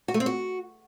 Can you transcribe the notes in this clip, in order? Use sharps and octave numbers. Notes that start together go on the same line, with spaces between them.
F#4
A3
C4
F#4